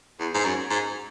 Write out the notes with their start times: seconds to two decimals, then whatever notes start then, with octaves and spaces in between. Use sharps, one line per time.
0.20 E2
0.34 G#2
0.45 F#2
0.70 G#2